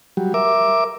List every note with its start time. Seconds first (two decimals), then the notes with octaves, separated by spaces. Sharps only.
0.17 F#3 G3
0.34 A#4 E5 D6